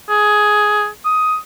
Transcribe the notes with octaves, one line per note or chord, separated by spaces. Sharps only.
G#4
D#6